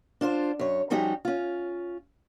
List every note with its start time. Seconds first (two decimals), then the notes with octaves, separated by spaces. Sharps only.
0.21 D4 F4 A#4 C5
0.59 F#2 C#5
0.90 F3 G3 C#4 D#4 F#4 G4
1.25 C#4 F4